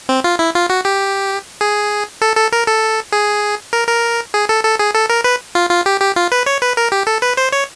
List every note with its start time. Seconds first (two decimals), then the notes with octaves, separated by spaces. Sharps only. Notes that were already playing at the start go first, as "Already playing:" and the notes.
0.09 C4
0.24 F4
0.39 E4
0.55 F4
0.70 F#4
0.85 G4
1.61 G#4
2.22 A4
2.36 A4
2.52 A#4
2.67 A4
3.12 G#4
3.73 A#4
3.88 A#4
4.34 G#4
4.49 A4
4.64 A4
4.79 G#4
4.95 A4
5.10 A#4
5.24 B4
5.55 F4
5.71 F4
5.86 G4
6.00 G4
6.16 F4
6.32 B4
6.46 C#5
6.62 B4
6.77 A#4
6.92 G4
7.07 A4
7.22 B4
7.37 C5
7.53 C#5